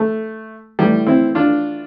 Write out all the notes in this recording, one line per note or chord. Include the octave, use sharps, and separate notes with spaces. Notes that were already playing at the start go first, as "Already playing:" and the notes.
Already playing: A3
A2 E3 G3
C4 E4
D4 F4